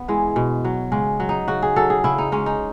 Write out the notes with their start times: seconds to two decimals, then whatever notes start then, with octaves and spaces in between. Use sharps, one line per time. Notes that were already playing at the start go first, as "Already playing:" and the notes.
Already playing: B3
0.08 E3 G#3
0.36 B2
0.65 F#3
0.92 C#3 G#3
1.20 F#3
1.29 D#4
1.48 C#3 F#4
1.62 G#4
1.76 F#3 A4
1.90 G#4
2.04 C#3 E4
2.18 D#4
2.32 G#3 C#4
2.46 D#4